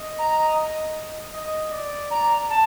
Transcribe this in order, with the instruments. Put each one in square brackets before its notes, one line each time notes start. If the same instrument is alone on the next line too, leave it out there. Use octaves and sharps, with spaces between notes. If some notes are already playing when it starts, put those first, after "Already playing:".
Already playing: [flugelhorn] D#5
[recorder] A#5
[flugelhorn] D#5
D5
[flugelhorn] D5 [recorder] A#5
[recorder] A5